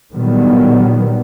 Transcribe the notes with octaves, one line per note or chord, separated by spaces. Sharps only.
A#2 D3 D#3 F#3 G3 B3